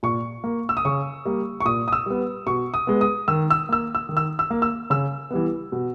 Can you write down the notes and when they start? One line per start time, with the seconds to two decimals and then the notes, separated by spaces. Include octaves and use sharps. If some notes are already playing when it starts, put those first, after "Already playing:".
0.03 A#2 C#6
0.44 A#3
0.69 E6
0.77 D#6
0.85 C#3 C#6
1.25 G3 A#3
1.60 C#6
1.65 A#2 D#6
1.88 D#6
1.93 E6
2.06 G3 B3
2.46 B2 C#6
2.74 D#6
2.87 G#3 B3
3.01 D#6
3.28 D#3 E6
3.50 E6
3.69 A#3 E6
3.95 E6
4.09 D#3
4.17 E6
4.39 E6
4.50 A#3
4.62 E6
4.90 C#3 E6
5.31 E3 G3 B3
5.72 B2